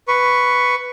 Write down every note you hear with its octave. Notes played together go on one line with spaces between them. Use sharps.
B4 C#6